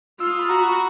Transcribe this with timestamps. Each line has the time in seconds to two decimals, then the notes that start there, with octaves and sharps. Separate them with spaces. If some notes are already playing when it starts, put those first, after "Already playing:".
0.20 F4 E6
0.31 D#6
0.39 B5
0.49 F#4 A#5
0.59 B5
0.69 C#6